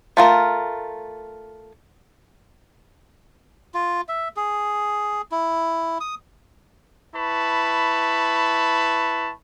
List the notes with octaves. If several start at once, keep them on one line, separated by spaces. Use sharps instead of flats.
A3 F4 A#4
F4
E5
G#4
E4
D#6
E4 B4 A5 B5 C#6